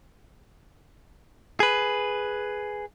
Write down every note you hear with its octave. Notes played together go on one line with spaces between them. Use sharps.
G#4 B4